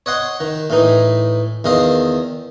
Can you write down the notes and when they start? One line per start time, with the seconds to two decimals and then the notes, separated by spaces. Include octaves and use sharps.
0.06 C#5 D#5 F#5 C6
0.40 D#3
0.70 A2 E3 D#4
1.64 E2 D#3 D#5 F5